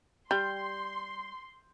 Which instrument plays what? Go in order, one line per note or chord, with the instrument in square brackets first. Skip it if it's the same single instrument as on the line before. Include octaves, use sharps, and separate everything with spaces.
[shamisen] G3 [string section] C6 [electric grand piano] G6